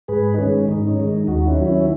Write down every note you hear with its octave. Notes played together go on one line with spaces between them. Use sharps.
G#2 G#4 B4
D#4
D#3 G#3 C#4
G#2 D#4
C#4
D#3 G#3
D#4
D#2 D#4 F#4
C#4 E4
D#3 F#3
C#4 E4